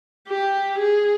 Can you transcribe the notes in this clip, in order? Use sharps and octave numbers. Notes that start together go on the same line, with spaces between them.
G4
G#4